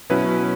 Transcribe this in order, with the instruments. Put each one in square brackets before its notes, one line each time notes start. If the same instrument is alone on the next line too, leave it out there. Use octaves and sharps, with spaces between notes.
[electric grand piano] B2 F#3 C#4 E4 B4